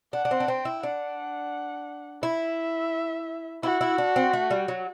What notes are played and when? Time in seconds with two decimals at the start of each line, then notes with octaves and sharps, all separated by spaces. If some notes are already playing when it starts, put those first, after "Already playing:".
0.13 D4 F#5
0.25 D4
0.31 C4
0.40 D4
0.48 C4 G5
0.65 E4
0.83 D4 F#5
2.23 E4 E5
3.63 E4 F#4
3.81 E4
3.98 D4
4.16 C4
4.33 A3
4.50 G3
4.68 F#3